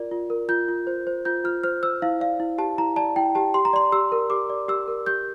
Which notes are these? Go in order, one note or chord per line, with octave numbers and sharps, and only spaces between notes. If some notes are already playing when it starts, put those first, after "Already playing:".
Already playing: F4 A#4 D5
F4
A#4
F4 G6
F4
C5
C5
F4 G6
F4 F6
C5 F6
C5 E6
E4 F5
D5 F5
E4
G4 A5
E4 A#5
D5 A5
E4 G5
G4 A5
G4 C6
A#5
D5 C6
G4 E6
A#4
G4 D6
D5
G4 E6
A#4
G4 G6